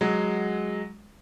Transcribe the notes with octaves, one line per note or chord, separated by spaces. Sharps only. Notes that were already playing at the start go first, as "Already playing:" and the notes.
F#3 G#3